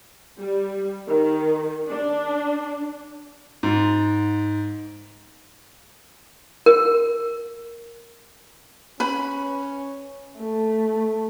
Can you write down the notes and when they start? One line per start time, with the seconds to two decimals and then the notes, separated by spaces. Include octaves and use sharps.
0.40 G3
1.08 D#3
1.89 D4
3.63 G#2
6.66 A#4
9.00 C#4 B4 B5
10.40 A3